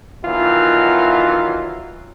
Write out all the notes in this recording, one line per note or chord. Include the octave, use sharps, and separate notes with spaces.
B2 D#3 E3 F#3 F4